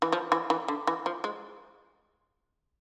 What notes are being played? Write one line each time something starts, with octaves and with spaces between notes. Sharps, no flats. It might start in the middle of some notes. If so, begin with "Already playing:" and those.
E3
F3
E3
E3
D3
E3
F3
G#3